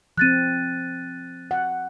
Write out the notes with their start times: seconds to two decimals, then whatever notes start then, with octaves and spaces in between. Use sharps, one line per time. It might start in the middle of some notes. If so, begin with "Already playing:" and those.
0.18 F3 C4 F#6 A6 D#7
1.51 F#5